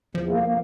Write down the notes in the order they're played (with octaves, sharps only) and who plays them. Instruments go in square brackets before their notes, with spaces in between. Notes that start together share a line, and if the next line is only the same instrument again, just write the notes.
[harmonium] E2 [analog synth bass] F3
[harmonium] A#3
A#3